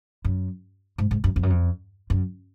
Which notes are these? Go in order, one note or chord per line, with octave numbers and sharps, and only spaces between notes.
F#2
G#2
G#2
F#2
F2
F#2
F2
F#2